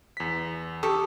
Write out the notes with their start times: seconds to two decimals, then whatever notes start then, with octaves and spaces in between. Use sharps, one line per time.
0.17 E2 B6
0.83 G4 A4 C#6 D#6